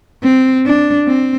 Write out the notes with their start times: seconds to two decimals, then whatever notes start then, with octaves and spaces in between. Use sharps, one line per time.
0.23 C4
0.66 D4
1.08 C4